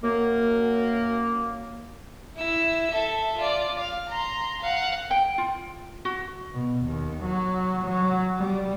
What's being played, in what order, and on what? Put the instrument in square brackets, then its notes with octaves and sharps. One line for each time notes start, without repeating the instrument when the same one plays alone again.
[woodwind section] F#2 A#3
[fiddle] E4 E6
A4 E5
F4 D5
F5 F6
A#5 C6
F5 F#5
[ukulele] G5
F4
F#4
[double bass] B2
D#2
F#3
F#3
G3